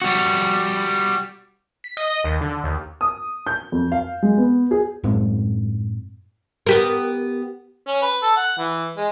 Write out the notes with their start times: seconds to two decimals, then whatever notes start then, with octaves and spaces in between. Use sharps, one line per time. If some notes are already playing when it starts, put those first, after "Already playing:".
0.02 G3 F#4
1.84 B6
1.97 D#5
2.24 D#2
2.41 D3
2.64 D#2
3.01 D#6
3.47 G6
3.72 F2
3.92 F5
4.23 G#3
4.38 B3
4.71 G#4
5.04 F#2 A2 G#3 C4
6.66 B3 G4 A#4
7.87 C#4
8.02 B4
8.22 A4
8.37 F#5
8.58 E3
8.97 G#3